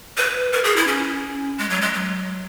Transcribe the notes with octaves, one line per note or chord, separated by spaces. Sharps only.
B4
A#4
G#4
E4
C#4
G#3
F#3
G#3
F#3